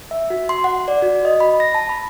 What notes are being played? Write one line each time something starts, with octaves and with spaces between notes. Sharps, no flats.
E5
F#4
C6
F#5
D5
F#4
D#5
B5
A#6
A5
B5